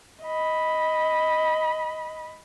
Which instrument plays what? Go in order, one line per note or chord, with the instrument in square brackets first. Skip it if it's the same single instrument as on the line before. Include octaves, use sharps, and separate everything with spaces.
[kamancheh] D#5 B5